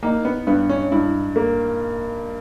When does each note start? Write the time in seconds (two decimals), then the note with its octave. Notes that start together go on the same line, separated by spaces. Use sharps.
0.02 A#3 D#4
0.25 B3
0.47 G2 B3
0.69 C#4
0.92 G2 E4
1.36 A#3